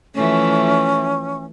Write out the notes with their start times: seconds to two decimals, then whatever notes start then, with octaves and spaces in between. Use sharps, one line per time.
0.15 E3 F3 A3 C#4